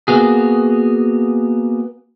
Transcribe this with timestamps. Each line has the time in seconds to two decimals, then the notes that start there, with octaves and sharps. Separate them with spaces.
0.08 A#3 B3 F#4 G#4